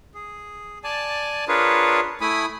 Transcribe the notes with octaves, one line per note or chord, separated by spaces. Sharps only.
G#4
D5 G#5 A5
D4 F4 G#4 A#4 B4 C#5
A3 E4 G#5 B5 D#6